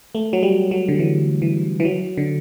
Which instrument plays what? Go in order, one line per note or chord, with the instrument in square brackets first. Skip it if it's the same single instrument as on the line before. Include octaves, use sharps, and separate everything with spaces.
[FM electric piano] A3
F#3
G3
F#3
D3
E3
E3
E3
F#3
D3